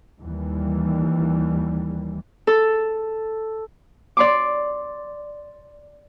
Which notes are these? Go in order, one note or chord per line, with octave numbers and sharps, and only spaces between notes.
D#2 E3 G3
A4
D5 C6 D6